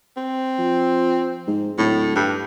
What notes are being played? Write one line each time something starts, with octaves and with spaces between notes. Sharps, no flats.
C4
F3
G#2
D1 A2
G2